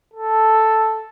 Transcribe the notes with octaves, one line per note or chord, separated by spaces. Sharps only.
A4